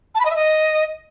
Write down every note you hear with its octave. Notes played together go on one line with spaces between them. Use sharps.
A5
B5
D#5
E5
D#5